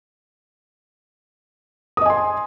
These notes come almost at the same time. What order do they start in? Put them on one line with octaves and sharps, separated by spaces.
D#6 D#5 G#5 C6